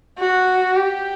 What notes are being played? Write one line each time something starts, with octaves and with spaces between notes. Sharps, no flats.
F#4
G4